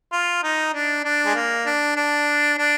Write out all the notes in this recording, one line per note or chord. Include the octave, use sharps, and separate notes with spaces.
F4
D#4
D4
D4
G#3
A#3
D4
D4
D4